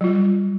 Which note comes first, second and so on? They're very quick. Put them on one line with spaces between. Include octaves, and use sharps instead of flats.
F#3 F4 G3